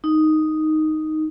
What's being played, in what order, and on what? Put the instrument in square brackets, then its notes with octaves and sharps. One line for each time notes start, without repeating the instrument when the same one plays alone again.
[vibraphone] D#4